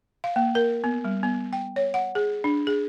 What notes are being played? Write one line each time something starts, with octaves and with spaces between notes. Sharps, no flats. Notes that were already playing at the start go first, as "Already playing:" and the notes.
F5
A#3
A#4
B3
G3
B3
G5
C#5
F#5
G#4
D4
G#4